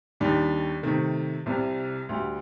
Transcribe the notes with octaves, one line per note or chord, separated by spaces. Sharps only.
D#2 D#3 G3 D4
C3 D#3 A3
C2 C3 G3
D2 D3 G3